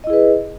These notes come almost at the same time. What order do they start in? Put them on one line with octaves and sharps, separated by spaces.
D#5 E4 G#4 B4